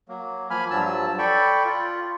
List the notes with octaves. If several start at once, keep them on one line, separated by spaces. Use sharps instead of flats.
F#3 A#3
F3 A#3 G#5 B5 F6
G2 F3 F#3 A5 E6
A4 D5 G5 B5 C#6
F4